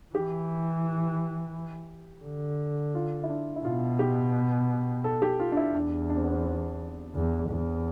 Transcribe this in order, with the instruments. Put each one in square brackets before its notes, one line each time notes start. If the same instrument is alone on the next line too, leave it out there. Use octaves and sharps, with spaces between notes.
[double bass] E3 [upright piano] G4
[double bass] D3
[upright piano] F4
E4
D4
E4
[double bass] B2 [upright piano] F4
[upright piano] G4
A4
G4
F4
D4
E4
[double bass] E2 [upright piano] D4
[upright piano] D4
C4
B3
C4
C4
[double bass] E2
E2